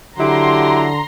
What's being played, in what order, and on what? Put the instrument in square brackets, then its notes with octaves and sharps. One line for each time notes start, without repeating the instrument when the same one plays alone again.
[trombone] D3 [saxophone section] F#3 E4 G4 [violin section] A#5 C6